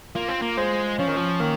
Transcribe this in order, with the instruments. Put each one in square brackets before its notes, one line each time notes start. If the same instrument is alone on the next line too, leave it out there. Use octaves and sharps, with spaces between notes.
[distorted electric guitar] A#3 [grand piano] F4
[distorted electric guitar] C4
A#3
[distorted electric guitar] G#3 [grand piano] C5
[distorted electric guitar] F3 [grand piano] C#4
[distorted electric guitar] D#3
F3
[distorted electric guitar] D#3 [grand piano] A#3